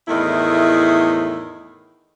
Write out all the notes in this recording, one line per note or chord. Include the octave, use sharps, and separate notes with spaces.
E2 A2 D#3 A3 E4 G#4